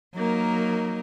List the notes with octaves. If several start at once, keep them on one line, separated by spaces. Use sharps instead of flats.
F#3 A#3 D#4 A#4